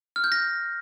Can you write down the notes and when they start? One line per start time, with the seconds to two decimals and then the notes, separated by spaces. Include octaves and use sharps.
0.16 F6
0.24 G6
0.32 A#6